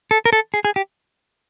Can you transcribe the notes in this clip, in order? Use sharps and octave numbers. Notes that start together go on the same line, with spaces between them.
A4
A#4
A4
G#4
G#4
G4